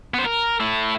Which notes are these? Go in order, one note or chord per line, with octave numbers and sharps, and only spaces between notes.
B3 C5
A#4
A3 E4